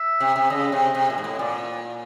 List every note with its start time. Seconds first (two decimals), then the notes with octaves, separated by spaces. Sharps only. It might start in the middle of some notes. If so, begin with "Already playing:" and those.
Already playing: E5
0.20 C3
0.36 C3
0.50 C#3 D#5
0.72 C3
0.95 C3
1.10 A#2
1.18 G#2
1.24 A2
1.39 A#2 D5